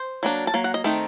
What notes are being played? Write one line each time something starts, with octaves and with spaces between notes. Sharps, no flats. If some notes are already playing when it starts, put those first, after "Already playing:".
Already playing: C5
F#3 A#3 D4
A5
F#3 A#3
F#5
D#5
D#3 A3 C4 D#4